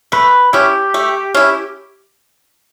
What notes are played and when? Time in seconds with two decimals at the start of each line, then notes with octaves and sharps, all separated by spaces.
0.12 A3 B4
0.53 C#4 E4 G4
0.94 A3
1.34 C#4 E4